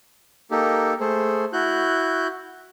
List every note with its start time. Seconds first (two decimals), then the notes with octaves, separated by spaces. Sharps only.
0.51 A#3 D#4 G4 A4
1.00 A3 G#4 A4 C5
1.53 E4 F#4 F#6 G6